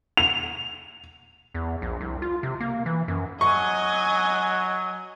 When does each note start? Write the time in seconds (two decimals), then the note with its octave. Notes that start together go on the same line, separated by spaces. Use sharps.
0.17 F7
1.54 E2
1.82 A#1
2.01 C2
2.22 F4
2.43 C3
2.60 A#3
2.86 E3
3.08 F#2
3.41 F#3 D#5 G#5 C#6